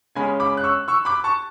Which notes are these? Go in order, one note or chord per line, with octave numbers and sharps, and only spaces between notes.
C#3 G#3 C#4 G#5 B5
B5 D6
F#6
C#6 E6
C#6 E6
B5 D6
A5 C#6